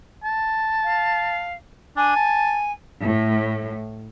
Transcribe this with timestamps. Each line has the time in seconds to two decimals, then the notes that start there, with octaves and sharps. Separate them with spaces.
0.24 A5
0.83 F5
1.97 D4 G#5
2.16 A5
3.02 A2